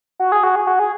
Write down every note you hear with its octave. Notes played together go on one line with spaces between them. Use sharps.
F#4
G#4
F#4
G#4
F#4
G#4